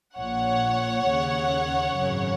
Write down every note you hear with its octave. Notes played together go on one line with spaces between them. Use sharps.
A#1 A#2 C#5 F#5
D#2 C#3
G#1 F#2 C#3